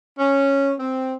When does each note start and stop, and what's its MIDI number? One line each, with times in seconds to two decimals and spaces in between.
0.18 0.73 61
0.80 1.15 60